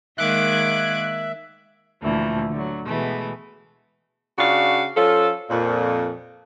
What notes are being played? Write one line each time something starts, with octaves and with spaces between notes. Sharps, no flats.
D#3 G#3 A#3 E5 D6 F#6 G#6
D2 A#2 E3 F3 A3
D3 F#3
B2 E3 G#3 A3 B3
C#3 D4 F#4 F5
F3 C#4 F4 A4
F2 A#2